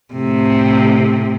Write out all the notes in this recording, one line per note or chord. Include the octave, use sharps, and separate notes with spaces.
A2 C3